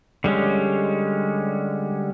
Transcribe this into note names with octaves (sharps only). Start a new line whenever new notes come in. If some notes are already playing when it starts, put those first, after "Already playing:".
D3 G3 G#3 C#4